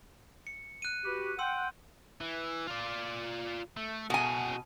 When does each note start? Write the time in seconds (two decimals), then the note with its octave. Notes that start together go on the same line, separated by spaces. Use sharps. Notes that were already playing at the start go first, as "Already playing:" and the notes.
0.47 C#7
0.82 F#6 D#7
1.05 F#4 G4 B4
1.39 F#5 G5 C6 E6
2.21 E3
2.68 F4 D5
3.77 A3
4.10 B2 F#4 G#4 G#5